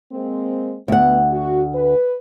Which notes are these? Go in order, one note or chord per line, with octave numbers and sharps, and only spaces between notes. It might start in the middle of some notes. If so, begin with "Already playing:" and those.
G#3 A#3 C4
D2 B3 F#5
F#4
B4